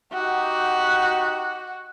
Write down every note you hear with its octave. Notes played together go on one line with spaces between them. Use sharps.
D#4 F#4 G4 F#5